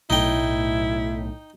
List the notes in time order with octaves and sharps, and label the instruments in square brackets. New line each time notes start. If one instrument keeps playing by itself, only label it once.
[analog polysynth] B1 A2 [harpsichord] D#4 G5 [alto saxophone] E4